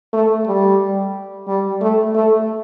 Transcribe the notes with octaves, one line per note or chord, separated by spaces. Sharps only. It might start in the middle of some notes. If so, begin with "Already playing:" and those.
A3
G3
G3
A3
A3